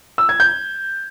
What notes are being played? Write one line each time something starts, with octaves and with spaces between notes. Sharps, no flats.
E6
G#6
G6